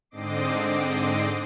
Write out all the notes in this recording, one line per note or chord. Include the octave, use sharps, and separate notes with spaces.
G#2 D3 C4 D#5 D6 C7